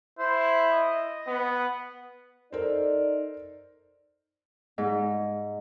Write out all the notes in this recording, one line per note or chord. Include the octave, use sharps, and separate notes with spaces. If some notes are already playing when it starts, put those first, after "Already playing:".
E4 C5
D#5
B3
D#4 A4 A#4 C5 D5
G#2